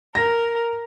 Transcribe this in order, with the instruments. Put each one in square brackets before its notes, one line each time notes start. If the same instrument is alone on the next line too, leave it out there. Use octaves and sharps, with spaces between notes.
[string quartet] A#4 [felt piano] A#6